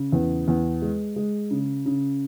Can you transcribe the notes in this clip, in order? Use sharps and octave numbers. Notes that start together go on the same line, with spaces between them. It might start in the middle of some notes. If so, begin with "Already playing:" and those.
Already playing: C#3
E2
E2
G#3
G#3
C#3
C#3